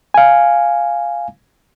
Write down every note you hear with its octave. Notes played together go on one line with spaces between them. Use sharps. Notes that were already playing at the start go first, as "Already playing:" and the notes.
F5 G#5